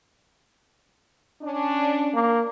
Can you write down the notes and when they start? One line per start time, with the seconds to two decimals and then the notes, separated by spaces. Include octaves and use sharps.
1.42 C#4 D4
2.15 A#3